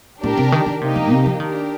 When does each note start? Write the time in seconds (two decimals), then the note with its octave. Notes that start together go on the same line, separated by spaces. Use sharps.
0.23 A2 D4 G4 A#4
0.37 C3
0.52 D#3
0.66 D#3
0.81 C3 A#3 D#4 G4
0.96 F2
1.10 C3
1.26 F3
1.40 D#3 D4 G4 A#4